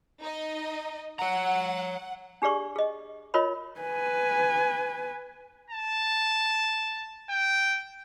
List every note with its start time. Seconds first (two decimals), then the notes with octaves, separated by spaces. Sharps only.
0.20 D#4 D#5
1.19 C#5 F#5 A#5
2.42 D4 G4 G#4 D5 C#6
2.76 G#4 D#5
3.34 F4 A#4 C#5 D#5 B5
3.80 B4 G#5
5.70 A5
7.30 G5